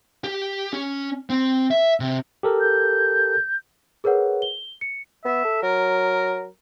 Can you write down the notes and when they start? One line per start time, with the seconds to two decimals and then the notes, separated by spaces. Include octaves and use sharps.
0.24 G4
0.73 C#4
1.30 C4
1.71 E5
2.00 C3
2.43 G4 A4 A#4
2.60 G6
4.04 G#4 A#4 B4 C#5 F#5
4.42 G7
4.81 C#7
5.25 B3 E5
5.44 A4
5.62 F#3 A#4